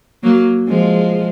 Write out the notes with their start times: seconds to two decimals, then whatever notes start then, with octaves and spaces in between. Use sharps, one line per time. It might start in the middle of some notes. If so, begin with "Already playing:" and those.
0.23 F#3 A#3
0.68 F3 G#3